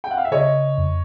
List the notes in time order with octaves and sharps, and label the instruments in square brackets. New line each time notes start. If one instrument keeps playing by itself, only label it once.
[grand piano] G5
F#5
F5
E5
[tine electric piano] C#3 [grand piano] C#5 D#5
[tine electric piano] F2